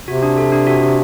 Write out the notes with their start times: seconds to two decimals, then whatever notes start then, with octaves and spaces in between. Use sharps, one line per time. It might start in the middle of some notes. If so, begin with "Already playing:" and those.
0.08 C3 F#4
0.23 D4
0.38 A4
0.52 D4
0.67 F#4
0.83 D4